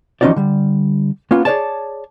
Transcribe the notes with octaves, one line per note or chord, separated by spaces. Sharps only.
E3 F3 C#4 D#4 F#4 D5
D3 G3
A#3 B3 C#4 F4
G#4 B4 C#5 D5 A5